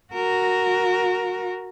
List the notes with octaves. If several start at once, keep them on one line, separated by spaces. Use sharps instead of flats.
F#4 A#4